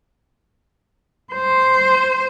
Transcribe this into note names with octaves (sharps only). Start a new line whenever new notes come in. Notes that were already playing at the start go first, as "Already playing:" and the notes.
C5